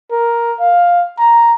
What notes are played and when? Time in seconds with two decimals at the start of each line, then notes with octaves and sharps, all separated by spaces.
0.11 A#4
0.60 F5
1.19 A#5